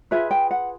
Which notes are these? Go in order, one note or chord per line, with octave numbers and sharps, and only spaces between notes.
F4 G#4 B4 E5
G5
F#5